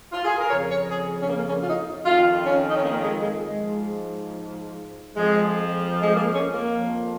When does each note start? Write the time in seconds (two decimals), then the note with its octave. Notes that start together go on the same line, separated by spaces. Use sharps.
0.13 F4
0.25 G#4
0.37 A#4
0.50 F2 C#3 F3 C#5
0.70 C#5
0.89 G#4
1.21 C#4
1.28 A#3
1.47 C#4
1.61 F4
1.67 D#4
2.06 F2 D#3 F4
2.44 C#4
2.69 D#4
2.76 C#4
2.84 A#3
3.03 G#3
3.22 G#3
3.42 G#3
3.62 G#2 F3
5.16 F2 F3 G#3
6.00 G#3
6.14 A#3
6.33 C#4
6.53 A#3
6.72 F2 F3